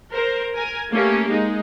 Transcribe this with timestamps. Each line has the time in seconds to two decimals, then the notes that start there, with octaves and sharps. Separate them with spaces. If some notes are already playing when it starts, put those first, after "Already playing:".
0.12 A#4 C5
0.55 A#4 G#5
0.91 A3 A#3 C#4 G4
1.29 G#3 D#4